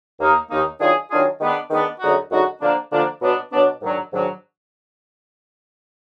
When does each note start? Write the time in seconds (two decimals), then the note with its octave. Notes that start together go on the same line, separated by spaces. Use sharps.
0.19 D#2 D#3 A#3 D#4
0.49 D#2 D#3 A#3 D#4
0.80 D#3 F#3 D4 F4 G#4
1.10 D#3 F#3 D4 F4 G#4
1.40 D#3 G#3 B3 D4
1.70 D#3 G#3 B3 D4
2.00 F#2 D3 G#3 D#4 F#4
2.31 F#2 D3 G#3 D#4 F#4
2.61 D3 F3 A#3 D4
2.91 D3 F3 A#3 D4
3.21 B2 F#3 B3 D4
3.51 B2 F#3 B3 D4
3.81 G#2 D#3 F#3 D4
4.12 G#2 D#3 F#3 D4